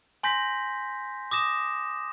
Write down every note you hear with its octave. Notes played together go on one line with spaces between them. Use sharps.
G#5 C6 G6 A#6 B6
D6 D#6 A#6 E7